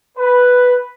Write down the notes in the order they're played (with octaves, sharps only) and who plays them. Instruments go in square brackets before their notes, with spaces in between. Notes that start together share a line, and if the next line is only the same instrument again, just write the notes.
[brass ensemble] B4